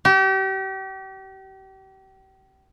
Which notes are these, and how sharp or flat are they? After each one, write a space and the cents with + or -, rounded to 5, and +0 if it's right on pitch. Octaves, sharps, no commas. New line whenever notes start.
G4 -35